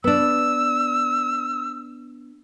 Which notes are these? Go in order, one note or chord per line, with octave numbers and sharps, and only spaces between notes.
B3 D4 E6